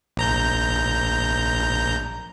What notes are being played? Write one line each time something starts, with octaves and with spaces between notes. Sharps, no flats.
A#1 A#5 G6